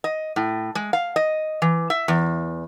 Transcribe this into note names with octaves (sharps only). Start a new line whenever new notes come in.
D#5
A2
G#3
F5
D#5
E3
E5
E2